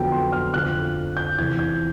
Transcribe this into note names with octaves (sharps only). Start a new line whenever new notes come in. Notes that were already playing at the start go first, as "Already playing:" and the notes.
Already playing: F2 D3 F#3 B3 G5
C6
F6
F2 D3 F3 F#6
G6
E2 C3 E3 G#6
G6